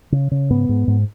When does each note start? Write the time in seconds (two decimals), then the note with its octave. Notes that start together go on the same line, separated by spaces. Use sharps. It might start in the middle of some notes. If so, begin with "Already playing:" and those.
0.12 C#3
0.31 C#3
0.50 G#2 B3
0.69 G#2
0.87 G#2